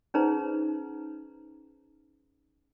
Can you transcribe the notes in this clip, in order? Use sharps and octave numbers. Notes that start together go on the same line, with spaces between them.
C#4 D#4 G#4 B4 C5 A#5